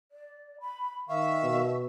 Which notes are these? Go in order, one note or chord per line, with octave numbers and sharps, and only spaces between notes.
D5
B5
D#3 E5 F5 C#6
B2